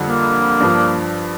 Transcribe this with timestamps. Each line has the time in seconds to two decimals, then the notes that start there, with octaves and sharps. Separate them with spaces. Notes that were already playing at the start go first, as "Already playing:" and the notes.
Already playing: F2 D3 G3
0.08 A#3
0.60 G2 F3 D4